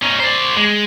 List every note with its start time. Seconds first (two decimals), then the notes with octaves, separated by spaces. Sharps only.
0.02 C#4 D#4
0.20 C5 D5
0.57 G#3